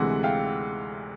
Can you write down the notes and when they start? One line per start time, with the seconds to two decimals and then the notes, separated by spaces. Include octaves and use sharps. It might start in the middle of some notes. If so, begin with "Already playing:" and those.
Already playing: D2 C3 E3 G#3 F#5
0.23 F5 G5